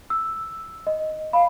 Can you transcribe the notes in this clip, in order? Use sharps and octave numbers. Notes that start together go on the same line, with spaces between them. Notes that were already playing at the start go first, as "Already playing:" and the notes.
E6
D#5
F5 B5